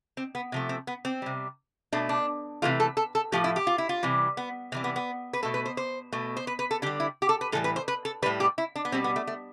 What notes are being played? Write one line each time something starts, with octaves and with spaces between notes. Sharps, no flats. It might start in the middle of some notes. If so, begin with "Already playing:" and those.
C4
B3
C3 F3 A3
C4
B3
C4
C3 G3
B2 A3 D4
D4
C3 E3 A3 F4
A4
A4
A4
A2 F3 A3 G4
E4
G4
F4
E4
F4
C3 E3 G3
B3
C3 E3 G3 C4
B3
B3
B4
B2 A3 A4
B4
C5
C5
B2 A3
C5
B4
B4
A4
D3 G3 G4
E4
G4
A4
B4
A2 E3 G3 A4
B4
C5
B4
A4
A2 G3 B4
G4
E4
D4
B3
B2 G3 C4
B3
A3
A3